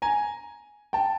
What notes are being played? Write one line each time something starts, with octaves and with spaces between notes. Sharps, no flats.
G#5 A#5
G5 A5